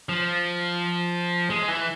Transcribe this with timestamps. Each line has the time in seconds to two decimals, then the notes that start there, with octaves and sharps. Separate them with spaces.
0.09 F3
1.50 G#3
1.68 E3